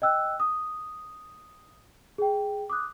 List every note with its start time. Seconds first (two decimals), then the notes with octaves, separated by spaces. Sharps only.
0.02 D#5 G5 E6 F#6
0.40 D#6
2.18 G#4 G5
2.70 D6 D#6 F#6